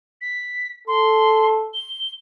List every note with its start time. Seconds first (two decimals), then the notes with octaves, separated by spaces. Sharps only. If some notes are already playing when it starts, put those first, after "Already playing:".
0.21 B6
0.88 A4 C6
1.74 G7